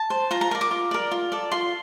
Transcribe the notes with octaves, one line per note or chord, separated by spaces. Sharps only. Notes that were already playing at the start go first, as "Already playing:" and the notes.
Already playing: A5
C5
F4 A#5
A#5
A#4 D5 A#5
D6
F4
A#4 D5
F4
A4 D5
F4 C6